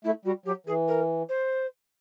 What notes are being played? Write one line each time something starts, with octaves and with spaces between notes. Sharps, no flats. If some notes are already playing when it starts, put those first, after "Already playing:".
A3 E4
G3 F#4
F#3 G4
E3 G#4
A#4
C5